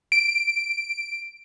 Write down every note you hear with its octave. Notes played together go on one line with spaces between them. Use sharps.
D7